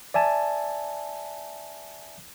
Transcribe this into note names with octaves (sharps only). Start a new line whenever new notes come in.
D5 E5 G#5 A5